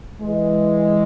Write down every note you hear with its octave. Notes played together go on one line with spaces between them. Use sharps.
E3 G#3